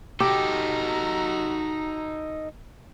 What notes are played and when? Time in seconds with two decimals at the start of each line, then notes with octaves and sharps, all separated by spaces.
0.20 D#4 F#4 G4 A4 A#5